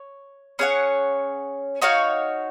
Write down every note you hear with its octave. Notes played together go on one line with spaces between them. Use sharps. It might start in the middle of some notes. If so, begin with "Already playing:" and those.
Already playing: C#5
C#4 G#4 C#5 F#5
D#4 F#4 C#5 F5